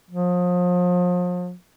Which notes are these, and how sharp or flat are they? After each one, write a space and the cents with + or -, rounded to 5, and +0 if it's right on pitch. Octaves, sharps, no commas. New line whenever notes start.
F3 +35